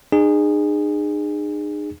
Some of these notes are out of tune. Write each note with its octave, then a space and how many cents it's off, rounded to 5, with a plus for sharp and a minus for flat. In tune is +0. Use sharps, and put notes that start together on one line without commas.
D#4 -45 G#4 -15